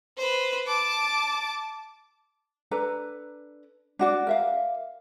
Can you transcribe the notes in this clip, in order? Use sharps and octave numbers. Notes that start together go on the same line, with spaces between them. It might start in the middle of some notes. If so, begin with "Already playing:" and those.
B4 C5
A5 D6
D4 A4 B4 A#5
D4 F#4 D5
A#4 E5 F5